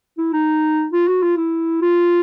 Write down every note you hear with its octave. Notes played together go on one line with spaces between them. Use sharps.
E4
D#4
F4
F#4
F4
E4
F4